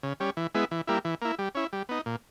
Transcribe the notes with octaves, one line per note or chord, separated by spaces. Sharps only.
C#3
G3 C#4
E3
G#3 B3 E4
E3
G3 A#3 E4
E3
A#3 E4
G3
C#4 E4
G3
B3 D#4
A#2